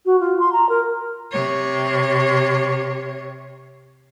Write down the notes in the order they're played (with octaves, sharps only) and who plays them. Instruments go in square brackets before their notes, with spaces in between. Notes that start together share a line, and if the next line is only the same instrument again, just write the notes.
[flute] F#4
F4
C6
A#5
A#4
[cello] C3 C#5